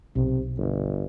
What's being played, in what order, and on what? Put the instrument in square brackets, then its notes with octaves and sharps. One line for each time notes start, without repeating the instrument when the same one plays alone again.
[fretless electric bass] B1 [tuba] C3
[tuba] G1